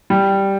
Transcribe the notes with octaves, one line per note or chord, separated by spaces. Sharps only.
G3